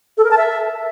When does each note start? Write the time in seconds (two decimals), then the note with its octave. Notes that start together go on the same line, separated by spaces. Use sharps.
0.17 A4
0.24 A#4
0.31 A5
0.37 E5